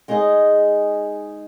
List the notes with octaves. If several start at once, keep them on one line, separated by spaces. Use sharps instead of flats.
G#3 D#4 G#4 D#5